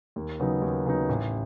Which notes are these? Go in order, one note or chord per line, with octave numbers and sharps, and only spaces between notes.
D#2
C#3 F#3 B3 D#4
D#2
C#3 F#3 B3 D#4
A1